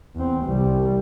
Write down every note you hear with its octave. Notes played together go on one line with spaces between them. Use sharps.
E2 C4
C2 G3